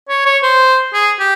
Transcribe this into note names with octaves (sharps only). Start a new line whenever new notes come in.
C#5
C#5
C5
G#4
G4